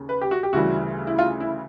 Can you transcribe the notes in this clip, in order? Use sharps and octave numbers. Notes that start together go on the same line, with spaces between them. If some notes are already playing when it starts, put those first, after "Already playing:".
Already playing: D#2 C#3
B4
G4
F#4
G4
D2 C#3 E3 G3 F#4
E4
F4
E4